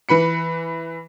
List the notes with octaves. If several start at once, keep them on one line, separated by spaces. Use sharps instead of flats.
E3 B4 B5 C#7